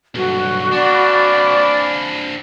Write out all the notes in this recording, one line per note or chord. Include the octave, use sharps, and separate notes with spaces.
B1 G2 F#4
C4 D4 D5 F5 G#5 B5